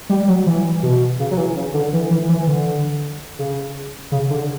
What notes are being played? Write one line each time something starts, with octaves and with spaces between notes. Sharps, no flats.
G3
F#3
E3
B2
C#3
F#3
E3
C#3
D3
E3
E3
E3
D3
C#3
C#3
D3